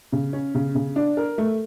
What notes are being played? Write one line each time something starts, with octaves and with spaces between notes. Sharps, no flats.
C#3
C#4
C#3
C#3
D4
A#4
A3